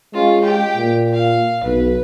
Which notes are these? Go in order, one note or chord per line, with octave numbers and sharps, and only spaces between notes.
G#3 C#4 F4
G4 G5
A#2
F5
B1 B4